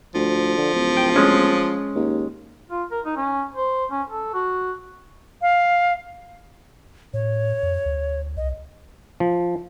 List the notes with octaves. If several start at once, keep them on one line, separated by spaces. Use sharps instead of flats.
D2 F3
D3
D1
G5
G#3 C#4
D#2
F4
A#4
D#4
C#4
C5
C#4
A4
F#4
F5
A2 C#5
F2
D2
C2 D#5
F3